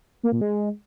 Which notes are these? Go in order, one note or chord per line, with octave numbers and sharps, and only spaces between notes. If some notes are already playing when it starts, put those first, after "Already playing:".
A#3
A#2
G#3